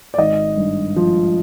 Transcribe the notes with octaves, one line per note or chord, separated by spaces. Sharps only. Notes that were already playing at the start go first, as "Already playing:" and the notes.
D5
G#1 D#5
G2
F3